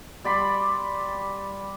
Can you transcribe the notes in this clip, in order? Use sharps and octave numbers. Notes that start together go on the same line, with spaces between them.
G3 D5 B5 C6